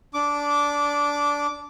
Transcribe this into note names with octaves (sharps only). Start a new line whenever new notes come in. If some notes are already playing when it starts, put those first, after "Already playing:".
D4 D6